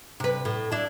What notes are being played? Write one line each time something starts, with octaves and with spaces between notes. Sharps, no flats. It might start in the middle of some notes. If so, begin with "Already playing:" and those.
C3 B4
A2
D4 E4